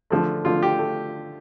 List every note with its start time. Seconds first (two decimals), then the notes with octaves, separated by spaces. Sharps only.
0.10 D3 F3 A3
0.45 D3 F3 A3 F4
0.63 G4
0.79 A3